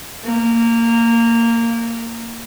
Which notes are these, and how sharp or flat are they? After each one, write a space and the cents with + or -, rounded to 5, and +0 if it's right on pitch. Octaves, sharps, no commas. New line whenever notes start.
A#3 -15